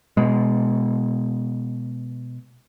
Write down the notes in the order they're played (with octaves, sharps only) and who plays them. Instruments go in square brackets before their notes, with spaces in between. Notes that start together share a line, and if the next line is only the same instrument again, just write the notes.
[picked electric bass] B2 G#3